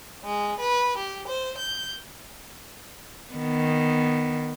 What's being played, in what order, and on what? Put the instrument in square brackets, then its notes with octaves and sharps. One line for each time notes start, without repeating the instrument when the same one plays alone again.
[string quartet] G#3
B4
G4
C5
G6
[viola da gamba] D#3 B3